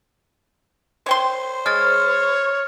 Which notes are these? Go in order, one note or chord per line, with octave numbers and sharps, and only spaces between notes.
C5 C#5 G5 C6
G#3 C#5 F6 A6